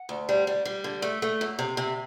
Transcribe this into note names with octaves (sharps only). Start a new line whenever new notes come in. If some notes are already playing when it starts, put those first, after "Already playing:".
Already playing: F#5
D2
G3
G3
G3
D3
A3
A3
F#2
C3
C3